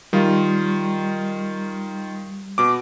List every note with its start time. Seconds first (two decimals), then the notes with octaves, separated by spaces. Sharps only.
0.13 D#3 G3 F4
2.58 B2 D6